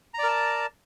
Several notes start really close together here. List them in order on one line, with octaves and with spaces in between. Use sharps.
A#5 D5 A#4 A5